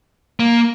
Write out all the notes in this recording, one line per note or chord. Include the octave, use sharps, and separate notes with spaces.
A#3